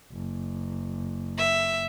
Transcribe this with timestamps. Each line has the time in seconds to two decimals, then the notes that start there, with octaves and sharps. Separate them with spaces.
0.12 F#1
1.38 E5